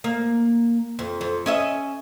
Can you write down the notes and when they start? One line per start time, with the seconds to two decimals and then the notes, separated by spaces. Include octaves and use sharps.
0.04 A#3
0.99 F2
1.21 F2
1.46 C#4 D#5 E5